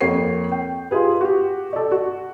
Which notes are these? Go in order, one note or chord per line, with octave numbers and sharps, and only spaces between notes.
F2 A#3 C#5 C7
G5
F4 G4 G#4 B4
F#4 G4
A4 D5
F#4